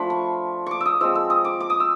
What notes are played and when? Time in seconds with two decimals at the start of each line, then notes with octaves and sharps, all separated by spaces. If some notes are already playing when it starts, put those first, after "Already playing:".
Already playing: F3 A3 D4 F4 B5
0.10 C#6
0.66 C#6 D6
0.81 D#6 E6
1.01 F3 G#3 C4 E6
1.15 E6
1.30 D#6
1.45 D6
1.60 D6
1.70 D#6
1.80 E6